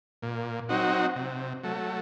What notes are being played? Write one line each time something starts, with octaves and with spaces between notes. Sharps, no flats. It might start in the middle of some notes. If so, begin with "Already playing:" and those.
A#2
F#3 C4 D#4 F#4
C3
F#3 A3